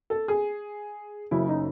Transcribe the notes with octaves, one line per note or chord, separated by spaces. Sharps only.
A4
G#4
F#1 F#2 C#3 E4
D#4